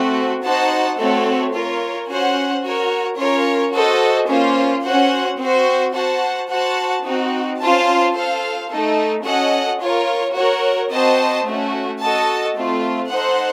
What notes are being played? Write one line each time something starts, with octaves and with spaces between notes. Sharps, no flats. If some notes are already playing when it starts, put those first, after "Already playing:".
Already playing: A3 C4 F#4
D#4 F#4 C5 F#5 A5
A3 C4 F#4 A4 C#5
F4 A#4 C#5
C#4 F#4 C5 F#5
F#4 A#4 C#5
C#4 F4 A#4 C#5
F#4 A4 C5 D#5
A#3 C#4 F4 C5
C#4 F#4 C5 F#5
C4 F#4 C5
F#4 C5 F#5 A5
F#4 C5 F#5 A5
C4 D#4 F#4
C#4 F4 C5 F5 A5
F4 A4 C5 F5
A3 D#4 A4
C#4 F#4 A4 D#5 F#5
F4 A#4 C#5
F#4 A#4 C#5
C4 F#4 C5 D#5 A5
A3 C#4 F#4
F#4 A4 D#5 A5
A3 C4 F4
D#4 A4 C5 F#5